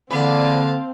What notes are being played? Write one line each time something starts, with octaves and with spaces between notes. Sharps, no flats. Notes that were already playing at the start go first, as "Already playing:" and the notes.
E2 D3 A#3 C4 B4 F5 A5